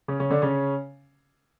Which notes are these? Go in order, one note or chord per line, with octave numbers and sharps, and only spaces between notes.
C#3 C#4
C#3 C#4
D3 D4
C#3 C#4